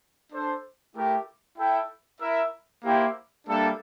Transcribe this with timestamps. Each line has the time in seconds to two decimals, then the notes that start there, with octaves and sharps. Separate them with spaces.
0.30 D4 A4 C5
0.93 A3 E4 G4 A#4
1.56 E4 A4 E5 G5
2.19 E4 A#4 E5
2.82 A#3 E4 G4 C5
3.45 G3 A#3 D4 A4 E5